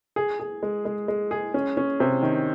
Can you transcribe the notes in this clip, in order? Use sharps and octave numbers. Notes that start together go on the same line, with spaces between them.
G#4
G#4
G#3
G#3
G#3
G#4
C#4
C#4
C3
D#3